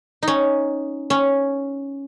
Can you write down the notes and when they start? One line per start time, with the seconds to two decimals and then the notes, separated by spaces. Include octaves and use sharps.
0.23 C#4 D#4
1.10 C#4